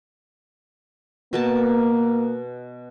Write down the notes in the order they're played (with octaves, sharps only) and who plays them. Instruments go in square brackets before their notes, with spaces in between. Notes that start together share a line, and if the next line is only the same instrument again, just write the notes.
[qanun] B2 A#4 A5 [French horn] A#3